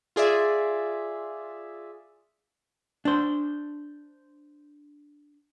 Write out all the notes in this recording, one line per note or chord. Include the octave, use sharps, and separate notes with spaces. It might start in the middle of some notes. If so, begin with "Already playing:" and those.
F4 G#4 D5 E5
D4 C5